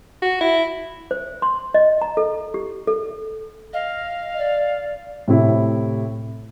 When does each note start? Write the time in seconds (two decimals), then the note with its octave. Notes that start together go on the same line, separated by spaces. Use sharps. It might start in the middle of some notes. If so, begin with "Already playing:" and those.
0.22 F#4
0.41 E4
1.11 C5
1.42 C6
1.74 D#5
2.02 A#5
2.17 A4
2.54 G4
2.87 A4
3.73 D#5 F5
4.38 D5
5.28 A2 C3 E4